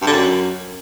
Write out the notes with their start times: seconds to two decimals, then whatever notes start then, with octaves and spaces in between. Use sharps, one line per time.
0.02 G2
0.07 D3
0.13 F#2